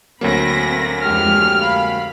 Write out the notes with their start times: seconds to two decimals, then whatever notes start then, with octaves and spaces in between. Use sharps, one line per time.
0.21 D2 F#3 A#3 C4 B5 A#6
1.03 F2 G#3 G4 F6
1.61 F5 B5